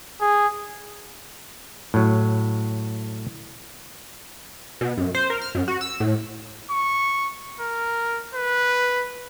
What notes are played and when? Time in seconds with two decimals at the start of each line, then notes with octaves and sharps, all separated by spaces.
0.21 G#4
1.94 A2 F#3
4.81 B2
4.97 F#2
5.15 C5
5.30 A#4
5.42 F6
5.55 F#2
5.68 F#4
5.81 E6
6.00 A2
6.72 C#6
7.60 A#4
8.35 B4